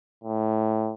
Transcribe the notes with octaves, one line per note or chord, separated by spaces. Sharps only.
A2